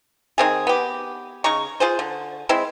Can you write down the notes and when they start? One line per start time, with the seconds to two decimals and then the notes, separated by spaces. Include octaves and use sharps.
0.38 D#3 C4 G#4
0.67 B3 G4
1.44 C#3 D#4 A#5 C#6
1.80 F4 G#4 C5
1.99 D3
2.49 G#3 C4 E4